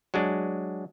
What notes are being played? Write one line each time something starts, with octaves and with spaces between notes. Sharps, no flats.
F#3 G#3 D4